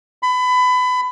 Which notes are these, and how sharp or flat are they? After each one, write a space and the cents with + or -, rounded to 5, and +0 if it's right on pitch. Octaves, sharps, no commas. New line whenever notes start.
B5 +25